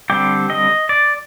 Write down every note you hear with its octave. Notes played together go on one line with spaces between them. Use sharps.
D3 G3 C4 G4
D#5
D5